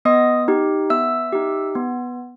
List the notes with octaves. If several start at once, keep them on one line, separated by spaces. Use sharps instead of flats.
B3 D#5 D#6
D#4 G4
B3 E5 E6
D#4 G4
B3